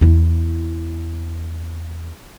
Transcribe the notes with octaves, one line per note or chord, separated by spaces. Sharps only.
E2 E4